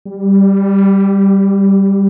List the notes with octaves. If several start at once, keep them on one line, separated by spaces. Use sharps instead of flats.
G3